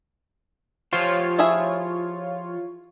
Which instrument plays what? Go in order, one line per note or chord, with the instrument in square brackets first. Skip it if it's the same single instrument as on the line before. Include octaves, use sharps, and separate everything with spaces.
[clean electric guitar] F3 G4 C5 [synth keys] F4 C#5
[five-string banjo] E4 G#4 E5